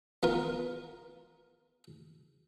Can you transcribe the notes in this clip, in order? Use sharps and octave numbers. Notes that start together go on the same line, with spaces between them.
B3 F4 A#4